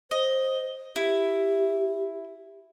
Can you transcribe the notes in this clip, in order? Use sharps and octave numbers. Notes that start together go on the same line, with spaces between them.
C5 D#5
E4 G4